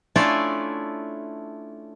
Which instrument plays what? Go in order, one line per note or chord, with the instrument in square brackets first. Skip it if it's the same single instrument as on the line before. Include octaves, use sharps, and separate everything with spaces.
[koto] A3 C#4 D4 E4 F4 D5